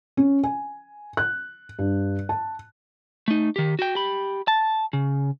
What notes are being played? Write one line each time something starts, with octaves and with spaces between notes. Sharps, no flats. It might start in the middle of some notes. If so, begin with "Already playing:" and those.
C#4
G#5
F#6
G2
A5
A3 D#4
D#3 G4
F#4 G5
G4 B5
A5
C#3